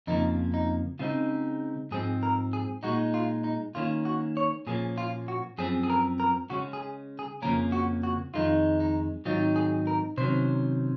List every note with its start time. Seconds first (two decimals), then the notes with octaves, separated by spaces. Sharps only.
0.07 F2 C#3 F3 A#3 D#4
0.54 D#4
0.99 C#3 G#3 C4 D#4 F4
1.91 G#2 F3 C4 G#4
2.23 A#4
2.53 G#4
2.83 A#2 G#3 D#4 F#4
3.14 F4
3.44 D#4
3.75 D#3 A#3 C#4 F4
4.05 F#4
4.37 C#5
4.67 A#2 F3 A#3 C#4 G#4
4.98 F4
5.28 F#4
5.58 F#2 F3 C4 G#4
5.83 G#4
5.90 A#4
6.20 A#4
6.50 C#3 G#3 C#4 F#4
6.73 G#4
7.19 G#4
7.42 F2 C#3 F3 A#3 C#4 A#4
7.72 F#4
8.03 F#4
8.34 F2 D#3 G#3 D#4 F4
8.80 D#4
9.25 G#2 D#3 F#3 C4 D#4 F4
9.56 G#4
9.87 A#4
10.17 C3 D#3 F#3 C#4 C5